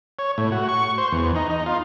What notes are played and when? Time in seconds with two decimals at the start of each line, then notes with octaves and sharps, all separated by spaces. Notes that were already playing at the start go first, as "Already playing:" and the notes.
0.19 C#5
0.38 A2
0.52 F#4
0.69 C#6
0.98 C5
1.12 E2
1.36 D#4
1.50 D#4
1.66 F4